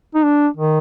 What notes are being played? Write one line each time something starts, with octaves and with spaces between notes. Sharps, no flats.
D#4
D4
D#3